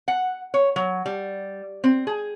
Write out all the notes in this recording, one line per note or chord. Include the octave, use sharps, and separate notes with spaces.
F#5
C#5
F#3
G3
C4
G#4